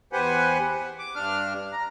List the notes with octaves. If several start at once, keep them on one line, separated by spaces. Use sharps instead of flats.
E2 G4 B4 C5 F#5 G#5
F#5
D6
G2 D4 F6
A#5